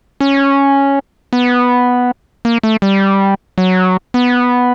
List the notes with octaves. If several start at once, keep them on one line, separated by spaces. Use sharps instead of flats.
C#4
B3
A#3
A3
G3
F#3
B3